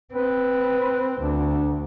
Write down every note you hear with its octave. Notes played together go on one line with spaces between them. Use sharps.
C4 B4
D2 D4